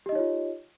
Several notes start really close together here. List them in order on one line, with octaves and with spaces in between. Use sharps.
G4 D#5 D#4 C#5 F4